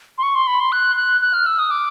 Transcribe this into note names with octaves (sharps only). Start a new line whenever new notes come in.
C6
C#6
C6
B5
C6
F#6
F#6
F#6
F6
E6
D#6
D6